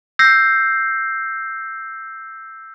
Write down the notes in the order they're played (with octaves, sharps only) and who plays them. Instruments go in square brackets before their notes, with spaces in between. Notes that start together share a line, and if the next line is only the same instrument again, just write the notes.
[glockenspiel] E6 G6 A#6 C7